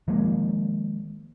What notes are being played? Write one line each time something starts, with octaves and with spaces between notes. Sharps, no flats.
D#3 F3 G#3 A#3